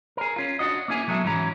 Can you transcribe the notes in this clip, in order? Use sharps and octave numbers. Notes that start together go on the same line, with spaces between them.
G#4 A#4
C#4 F4
D4 F#4 D#5
A#3 C#4 E4 G#4 G#5
B2 F#3 G#3 A4 E5
G#2 E3 F#3 C#4 A#5